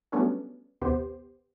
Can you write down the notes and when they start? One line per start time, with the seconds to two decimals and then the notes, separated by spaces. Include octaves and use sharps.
0.12 F#3 G3 A3 B3 C#4 D4
0.82 A#1 D#2 C3 B3 G4 C5